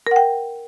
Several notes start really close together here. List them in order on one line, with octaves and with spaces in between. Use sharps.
A#4 F#5 G5